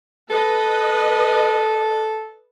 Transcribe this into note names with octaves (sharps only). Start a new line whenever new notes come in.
A4 B4 D#5